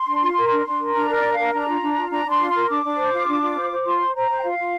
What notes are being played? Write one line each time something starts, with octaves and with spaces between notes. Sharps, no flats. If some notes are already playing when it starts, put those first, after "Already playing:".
Already playing: C6
D4
F4
A#4
D4
D4
A#4
D4 A#5
A#4
D5
D4
A#4 F5
D4 A#5
F4
D4
F4
D4 A#5
D4 C6
F4
A#4 C6
D4 D6
D4
C5
F4
D4
F4
C5
C5
F4 C6
C5
C5 A#5
C5
G5
F4 F5
F4